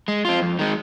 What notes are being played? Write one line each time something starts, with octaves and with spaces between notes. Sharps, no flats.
G#3
C4 F4
F2
D#3 G#3